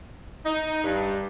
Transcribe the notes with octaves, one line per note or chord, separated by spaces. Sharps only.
D#4
G2